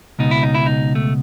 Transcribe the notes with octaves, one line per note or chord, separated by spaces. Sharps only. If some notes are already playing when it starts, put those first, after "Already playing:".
C#2 B2 D#4
E4
D#4
E4
D#4
A3